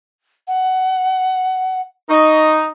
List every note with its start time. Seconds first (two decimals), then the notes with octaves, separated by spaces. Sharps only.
0.48 F#5
2.09 D#4 C#6